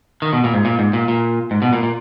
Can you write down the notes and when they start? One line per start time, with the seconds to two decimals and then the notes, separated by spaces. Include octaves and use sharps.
0.22 D#3
0.33 B2
0.44 A#2
0.54 G#2
0.65 A#2
0.79 G#2
0.93 A#2
1.08 A#2
1.51 G#2
1.62 B2
1.73 A#2
1.83 A#2